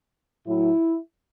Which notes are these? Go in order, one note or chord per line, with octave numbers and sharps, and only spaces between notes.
A2 F#3 E4